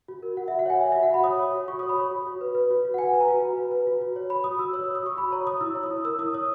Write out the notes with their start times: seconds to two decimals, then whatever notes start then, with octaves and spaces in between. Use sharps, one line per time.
0.08 F#4
0.23 A#4
0.37 F#4 F#5
0.48 E5
0.51 F#4
0.59 F#5
0.66 C#5 G#5
0.81 C#5 E5
0.92 E5
0.96 F#4
1.03 F#5
1.10 F#4 B5
1.24 C#5 D#6
1.39 C#5
1.54 F#4
1.68 F#4 C#6
1.79 D#6
1.83 C#5
1.89 B5
1.97 C#5
2.11 F#4
2.27 F#4
2.41 B4
2.55 B4
2.70 F#4
2.85 F#4
2.94 F#5
2.98 B4 G#5
3.13 B4
3.21 A#5
3.28 F#4
3.43 F#4
3.57 B4
3.71 B4
3.87 F#4
4.01 F#4
4.16 C#5
4.30 C#5 B5
4.44 F#4 D#6
4.59 F#4 E6
4.73 C#5 E6
4.84 E6
4.88 C#5
4.95 D#6
5.03 F#4 C#6
5.17 F#4 B5
5.32 C#5 A#5
5.46 C#5 D#6
5.61 E4 E6
5.75 C#5
5.83 D#6
5.91 E4
6.04 A#4 E6
6.19 E4 D#6
6.34 C#5 D#6